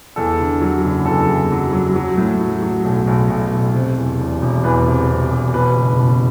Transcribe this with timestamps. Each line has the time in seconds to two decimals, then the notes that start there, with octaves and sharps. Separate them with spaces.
0.16 E2 A4
0.39 D3
0.61 F#3
0.84 F#1
1.06 E2 A4
1.28 E2
1.52 F#3
1.73 F#3
1.95 F#3
2.17 A2
2.41 F#3
2.62 F#3
2.85 B1
3.07 B1
3.30 B1
3.52 B1
3.74 C3
3.97 E2
4.20 E1
4.42 E1
4.64 E2 B4
4.86 C3
5.09 C3
5.32 E1
5.54 B2 B4
5.76 F#1
5.98 B2